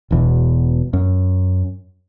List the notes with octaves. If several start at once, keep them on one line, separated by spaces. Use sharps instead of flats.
E1 E2 B2
F#2